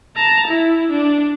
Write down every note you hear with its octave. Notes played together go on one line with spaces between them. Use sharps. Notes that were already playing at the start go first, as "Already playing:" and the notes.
A5 A#5
E4
D4